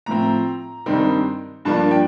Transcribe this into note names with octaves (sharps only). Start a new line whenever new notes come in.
A2 F3 C4 A#5
G2 D#3 G3 C4 D#4
G2 F3 A#3 D4 A5
G5